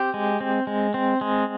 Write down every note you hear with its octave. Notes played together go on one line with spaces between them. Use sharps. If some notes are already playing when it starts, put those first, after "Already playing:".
Already playing: C4 G4
G#3
C4
G#3
C4
G#3